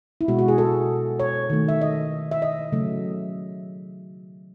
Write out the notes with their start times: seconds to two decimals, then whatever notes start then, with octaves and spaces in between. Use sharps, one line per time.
0.21 E4
0.28 B2 G#3 F#4
0.39 F#4
0.48 G#4
0.58 A4
1.20 C#5
1.50 D#3 A3
1.68 E5
1.81 D#5
2.31 E5
2.42 D#5
2.72 C#3 F#3 A3